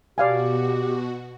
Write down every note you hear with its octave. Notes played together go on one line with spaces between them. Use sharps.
B2 F#4 G4 D5 F5 G#5